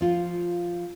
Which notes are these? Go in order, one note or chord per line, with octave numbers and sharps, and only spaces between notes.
F3 F4